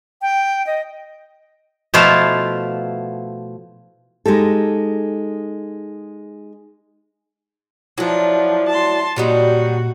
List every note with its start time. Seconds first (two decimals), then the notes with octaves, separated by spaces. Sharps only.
0.22 G5
0.67 D#5
1.94 B2 F3 A3 E4 F4 F5
4.26 G#3 D#4 G4 A4
7.98 F3 F#3 D4 E4
8.69 A5 C6
9.16 A#2 F#3 G3 D#4 F#4